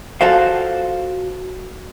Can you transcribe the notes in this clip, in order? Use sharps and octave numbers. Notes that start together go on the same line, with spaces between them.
F4 F#4 A4 C5 F5